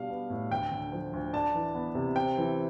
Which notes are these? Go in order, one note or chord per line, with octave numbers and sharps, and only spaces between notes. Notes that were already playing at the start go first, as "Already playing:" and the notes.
Already playing: B2 G3 D4 F5
B3
A2
D2 G5
D3
F3
D2
D4 A5
E3
B3
C3
C4 G5
E3